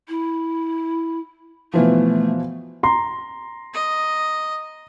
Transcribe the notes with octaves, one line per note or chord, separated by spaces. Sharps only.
E4
B2 E3 F3 A3
A#5 C6
D#5